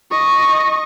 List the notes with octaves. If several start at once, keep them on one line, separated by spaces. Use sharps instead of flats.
D#5 C#6